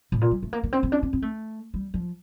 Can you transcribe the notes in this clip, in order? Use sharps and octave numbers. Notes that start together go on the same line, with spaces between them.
A2
A#2
G3
A3
A#3
A#3
C4
C4
D4
C4
C4
A3
G3
F3